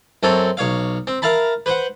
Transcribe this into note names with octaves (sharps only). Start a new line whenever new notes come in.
F#2 C4 A4 C#5
B1 C#5 F5
C4
A#4 E5 F5 A5 B5
B4 C5 F#5